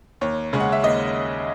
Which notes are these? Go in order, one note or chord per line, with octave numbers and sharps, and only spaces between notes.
D#2 C#5
C#3 G#3 C#4
F#5
E5
D#2 D#5